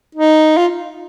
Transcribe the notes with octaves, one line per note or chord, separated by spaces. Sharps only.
D#4
F4